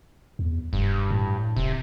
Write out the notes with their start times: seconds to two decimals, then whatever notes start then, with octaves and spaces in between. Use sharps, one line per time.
0.39 E2
0.73 E1 G2
1.10 A2
1.56 D#1 C3